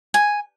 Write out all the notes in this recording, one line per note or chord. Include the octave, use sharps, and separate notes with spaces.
G#5